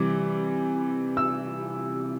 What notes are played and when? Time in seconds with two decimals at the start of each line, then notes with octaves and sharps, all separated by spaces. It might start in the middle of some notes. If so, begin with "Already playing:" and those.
Already playing: C3 E3 G3 D6
1.17 E6